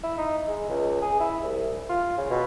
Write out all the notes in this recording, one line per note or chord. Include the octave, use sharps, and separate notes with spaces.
E4
D#4
G#3
C#2
G#4
E4
C2
F4
C#3
B2